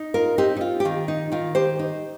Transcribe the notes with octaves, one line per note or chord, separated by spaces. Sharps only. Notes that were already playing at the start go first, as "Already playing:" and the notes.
Already playing: D#4
F4 A#4
C4 D#4 G4
D#4
F4
G4
D#3 F4
D#4
D#3 F4
G4 C5
D#4